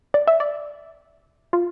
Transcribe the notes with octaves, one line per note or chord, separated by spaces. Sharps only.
D5
E5
D5
F4